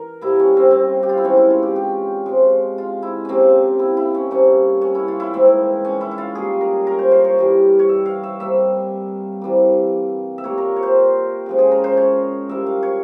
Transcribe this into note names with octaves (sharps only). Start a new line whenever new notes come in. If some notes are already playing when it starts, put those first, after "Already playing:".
Already playing: E3 A#4
G2 G3 A#3 E4
C#4
C4
C4
G4
F4
E4
C3 E3 G#3 C#4
E4
F4
G4
G4
C3 F3 G#3
F4
E4
C3 F3 A#3 C4 C#4
E4
E4
C#4
C3 G3 A#3 C#4
C#4
E4
F4
E4
G#2 E3 A#3 C4
C#4
E4
E4
F4
A#2 G3 A#3 G#4
A#4
A#4
C5
C5
C#5
G2 E3 G3
C#5
E5
F5
E5
C3 G3 A#3 E5
C3 E3 G3 A#3
E5
A#2 G3 A#3 C#5
A#4
C#5
C5
C#3 F3 G#3
G#4
A#4
C5
C#5
A#2 G3 A#3 E5
F5
C#5